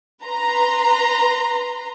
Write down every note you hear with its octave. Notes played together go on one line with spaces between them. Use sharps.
B4 A#5 C6